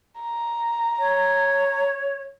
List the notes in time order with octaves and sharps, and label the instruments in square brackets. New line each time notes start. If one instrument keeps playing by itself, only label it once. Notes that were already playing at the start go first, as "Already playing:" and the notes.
[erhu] A#5
[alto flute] C#5